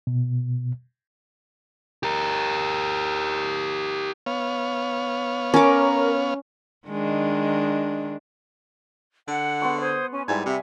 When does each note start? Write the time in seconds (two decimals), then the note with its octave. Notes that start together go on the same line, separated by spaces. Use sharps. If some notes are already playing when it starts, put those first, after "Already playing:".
0.07 B2
2.03 G4 A#4
4.26 B3 C#5 F5
5.54 C#4 A#4 D6
6.87 D#3 G#3 D4
9.28 D3 F#5
9.62 B3 C6 C#6
9.81 C5 D#6 G#6
10.12 C#4 G#5
10.28 G#2 G3 B3 E4 D5 G#5
10.46 C3 E5